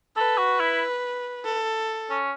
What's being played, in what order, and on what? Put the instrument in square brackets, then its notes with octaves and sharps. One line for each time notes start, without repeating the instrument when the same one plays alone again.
[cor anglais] A4 [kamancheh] B4
[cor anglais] F#4
E4
[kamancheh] A4
[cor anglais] C#4